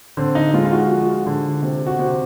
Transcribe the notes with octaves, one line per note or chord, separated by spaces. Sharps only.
D3 C4
D#4
G#3 F4
F4
F#4
F3 F#4
D3
C3
F#4
C3